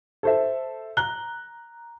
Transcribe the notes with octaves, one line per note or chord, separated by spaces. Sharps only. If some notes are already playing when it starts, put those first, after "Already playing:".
A4 C5 E5
A#5 F#6 G7